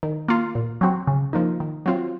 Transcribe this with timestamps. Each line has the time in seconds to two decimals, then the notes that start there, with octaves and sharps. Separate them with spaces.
0.03 D#3
0.28 A#3 F4
0.55 A#2
0.81 F#3 C4 F#4
1.07 C#3
1.33 F3 A#3 D#4
1.60 D#3
1.86 F#3 C4 F4